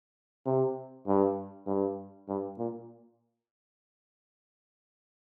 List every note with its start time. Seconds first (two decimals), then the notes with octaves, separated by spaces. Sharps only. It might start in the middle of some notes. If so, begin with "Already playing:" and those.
0.46 C3
1.07 G2
1.67 G2
2.29 G2
2.58 A#2